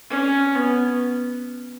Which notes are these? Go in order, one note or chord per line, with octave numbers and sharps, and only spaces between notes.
C#4
B3